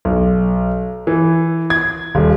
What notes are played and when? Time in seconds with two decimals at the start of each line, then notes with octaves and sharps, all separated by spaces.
0.05 B1
1.07 E3
1.70 G#6
2.15 D#1